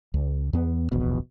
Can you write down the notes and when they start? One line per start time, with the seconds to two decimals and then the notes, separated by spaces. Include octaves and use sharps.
0.14 C#2
0.53 E2 B3
0.92 D1 A#1 E2 B2